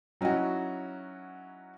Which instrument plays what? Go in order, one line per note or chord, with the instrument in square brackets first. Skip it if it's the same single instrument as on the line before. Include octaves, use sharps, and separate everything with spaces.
[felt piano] F#3 C#4 D#4 E4 F#4